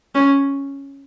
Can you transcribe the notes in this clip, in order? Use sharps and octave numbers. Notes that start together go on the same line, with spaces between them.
C#4